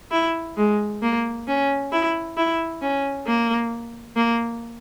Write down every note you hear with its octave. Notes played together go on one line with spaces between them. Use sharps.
E4
G#3
A#3
C#4
E4
E4
C#4
A#3
A#3